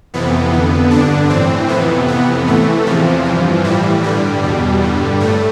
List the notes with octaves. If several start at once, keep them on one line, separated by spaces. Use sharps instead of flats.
F2 C3 E3 B3
F2 D3
G2 D3 D4
A2 E3 C4
F2 C3 E3 B3
F2 C3 E3 B3
A2 E3 A3
E2 C3 E3 F3
E3
G2
A2 E3 G3
G2 D3 G3
E2 B2
G2 D3
A2 A3